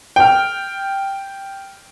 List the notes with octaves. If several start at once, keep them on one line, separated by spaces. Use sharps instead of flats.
G5 F6